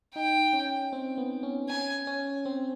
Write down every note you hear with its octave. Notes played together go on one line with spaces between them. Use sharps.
D#4 G5
C#4
C4
B3
C#4
C#4 G#5
C#4
C4